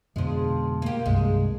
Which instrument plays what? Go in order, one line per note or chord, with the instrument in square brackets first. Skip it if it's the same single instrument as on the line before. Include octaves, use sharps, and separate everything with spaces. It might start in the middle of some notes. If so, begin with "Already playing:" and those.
[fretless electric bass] F2 B2 D3 [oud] F3 G#3
[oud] A#3 G4
[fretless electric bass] C2 G2 D#3 [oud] G#3